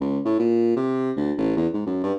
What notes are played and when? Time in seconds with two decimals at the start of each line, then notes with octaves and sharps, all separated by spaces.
0.01 C#2
0.25 A2
0.39 A#2
0.76 C3
1.17 D2
1.38 A1
1.57 E2
1.74 G#2
1.86 F#2
2.03 G2